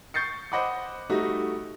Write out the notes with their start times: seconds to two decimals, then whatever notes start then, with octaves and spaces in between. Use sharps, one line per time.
0.14 C#6 G6 A6 C7 C#7
0.52 C5 D#5 F#5 B5 D6
1.10 G3 A3 D#4 F#4